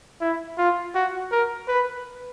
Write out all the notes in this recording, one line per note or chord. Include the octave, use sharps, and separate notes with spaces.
E4
F4
F#4
A#4
B4